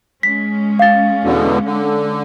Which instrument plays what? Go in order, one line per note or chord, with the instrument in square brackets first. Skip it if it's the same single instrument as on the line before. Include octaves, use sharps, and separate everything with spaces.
[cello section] G#3 C#4 [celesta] B6
[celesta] F5 A6
[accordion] E2 B2 D3
D3